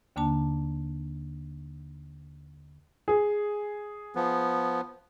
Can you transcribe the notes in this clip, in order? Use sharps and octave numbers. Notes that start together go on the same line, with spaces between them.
D#2 D3 A#3 D4 A5
G#4
F3 B3